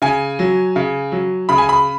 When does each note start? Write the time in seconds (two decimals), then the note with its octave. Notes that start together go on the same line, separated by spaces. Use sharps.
0.02 C#3 G#5
0.39 F#3
0.76 C#3
1.12 F#3
1.49 C#3 B5
1.58 G#5
1.69 B5